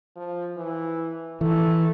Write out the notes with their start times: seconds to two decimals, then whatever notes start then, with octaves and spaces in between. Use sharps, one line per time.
0.16 F3
0.57 E3
1.41 E3 A3